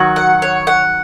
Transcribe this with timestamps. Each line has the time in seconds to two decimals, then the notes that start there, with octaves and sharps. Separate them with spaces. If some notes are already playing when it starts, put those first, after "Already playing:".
Already playing: D#3 F#3 F#4
0.16 F#5
0.42 C#5
0.67 F#5